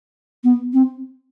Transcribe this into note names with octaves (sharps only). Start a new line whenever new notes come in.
B3
C4